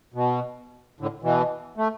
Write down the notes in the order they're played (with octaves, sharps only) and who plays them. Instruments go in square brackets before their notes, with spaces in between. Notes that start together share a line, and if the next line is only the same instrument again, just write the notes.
[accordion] B2
A2 D3
B2 E3
A3